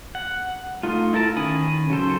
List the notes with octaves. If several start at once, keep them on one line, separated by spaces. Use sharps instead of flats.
F#5
A3 D#4 F4
E4 A4 A#4 A5
D#3 C#4 G#5 B5 D#6
C#3 F#3 A4 C5